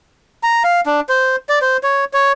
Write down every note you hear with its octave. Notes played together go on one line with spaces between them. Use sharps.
A#5
F5
D4
C5
D5
C5
C#5
C#5